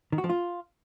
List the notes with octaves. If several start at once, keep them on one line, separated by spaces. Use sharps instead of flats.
D#3
F#4
F3
F4